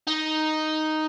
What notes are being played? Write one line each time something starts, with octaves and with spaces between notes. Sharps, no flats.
D#4